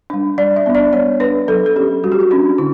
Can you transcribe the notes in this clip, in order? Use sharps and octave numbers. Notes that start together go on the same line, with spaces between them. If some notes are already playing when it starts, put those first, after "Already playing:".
G3 D4
G3 D5
E5
B3 D4
D5
G3 C#5
D4 B4
F#3 A4
A4
C#4 G4
G3 F#4
G4
F#4
C#4 D4
D3 E4